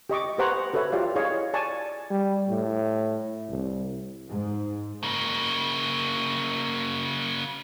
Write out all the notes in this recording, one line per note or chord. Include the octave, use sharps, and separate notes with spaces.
G4 D#5 C#6 D6
G4 B4 C5 F#5 A#5 C#6
F#4 A4 B4 C#5 E5
F4 G4 D5 F5
E4 G#4 C#5 D#5 F5 C#6
D5 G#5 A5 C#6
G3
A2
C2
G#2
C#3 A#3